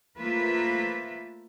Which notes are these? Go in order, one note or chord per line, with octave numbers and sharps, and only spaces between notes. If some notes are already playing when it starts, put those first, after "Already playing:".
A3 A#3 F4 B4 C5 E5